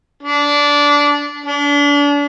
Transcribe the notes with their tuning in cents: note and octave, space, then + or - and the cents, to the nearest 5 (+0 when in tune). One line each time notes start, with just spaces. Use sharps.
D4 -15
D4 -35